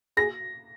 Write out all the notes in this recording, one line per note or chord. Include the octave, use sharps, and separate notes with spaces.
G#4 A#6